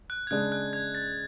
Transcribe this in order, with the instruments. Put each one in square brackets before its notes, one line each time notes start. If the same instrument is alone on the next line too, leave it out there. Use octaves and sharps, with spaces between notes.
[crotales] F#6
G#6
[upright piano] C#3 G#3 D4 [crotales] F#6
[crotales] F#6
G#6
A6